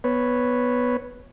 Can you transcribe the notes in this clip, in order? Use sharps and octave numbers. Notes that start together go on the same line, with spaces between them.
B3 B4 C#5